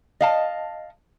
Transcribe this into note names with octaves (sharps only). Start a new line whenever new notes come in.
D#5 F5 A5